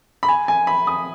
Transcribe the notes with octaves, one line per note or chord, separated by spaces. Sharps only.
B5
G#5
G#5
B5
D#6